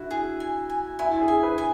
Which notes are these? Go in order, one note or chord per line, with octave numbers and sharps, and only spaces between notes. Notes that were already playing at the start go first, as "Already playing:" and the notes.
Already playing: E4 F#4
G#4
G#5
G#5
E4 G#5
G#4
G#5
B4
G#5